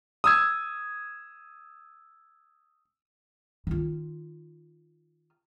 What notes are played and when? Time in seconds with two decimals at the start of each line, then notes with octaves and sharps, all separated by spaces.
0.24 D#6 E6 G#6
3.67 D#3 F4